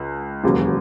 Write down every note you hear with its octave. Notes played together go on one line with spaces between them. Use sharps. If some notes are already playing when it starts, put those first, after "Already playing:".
Already playing: C#2
E1 D#2 C#3 F#3